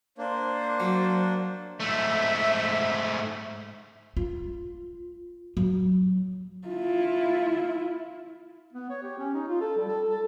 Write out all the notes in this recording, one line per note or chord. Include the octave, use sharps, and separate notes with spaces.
A#3 D4 C5
F#3
G#2 A3 E5
F4
F#3
E4 F4
B3
C#5
G4
C#4
D#4
F4
A4
G3
A4
A4